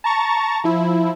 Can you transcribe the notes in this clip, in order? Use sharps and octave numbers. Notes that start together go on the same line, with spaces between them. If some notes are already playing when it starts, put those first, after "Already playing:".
A5 A#5 C#6 A6
F3 E4